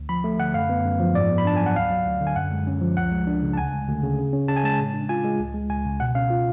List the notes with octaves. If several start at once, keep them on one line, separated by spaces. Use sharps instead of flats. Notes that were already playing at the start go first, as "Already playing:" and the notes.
Already playing: D2
F3 B5
A3
D3 F#5
F#2 F5
B3
F#2
F3
G#2 D5
B3
B5
D4 A5
G#5
F#3
F#5
D2 F5
F#3
D2
D3
G#5
F#2 F#5
G#3
C#4
F3
C#2 F#5
G#3
D4
C#3
A5
D2 G#5
G#3
D2
C#3
C#3
C#4
C#3 A5
G#5
G#3 A5
A2
D4
F4 G#5
G#3
C#2
G#3
C#2 G#5
C#3
B2 F#5
C#4 F5
F4